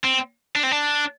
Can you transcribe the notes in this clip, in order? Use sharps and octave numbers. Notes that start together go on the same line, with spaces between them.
C4
D4
C4
D4